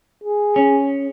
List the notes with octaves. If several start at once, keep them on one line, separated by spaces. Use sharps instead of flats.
G#4
C#4